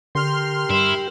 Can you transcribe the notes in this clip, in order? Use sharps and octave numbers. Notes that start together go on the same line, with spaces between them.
D3 G4 A#4 G5 C6 F6
G2 E4